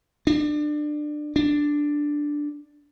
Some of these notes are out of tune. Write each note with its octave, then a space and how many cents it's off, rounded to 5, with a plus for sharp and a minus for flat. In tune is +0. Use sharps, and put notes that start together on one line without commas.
D4 +25
D4 +0